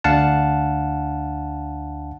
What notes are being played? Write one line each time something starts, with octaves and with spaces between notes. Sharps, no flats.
D2 D4 F5 F#5 A5